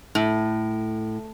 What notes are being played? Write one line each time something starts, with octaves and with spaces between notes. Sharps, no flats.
A2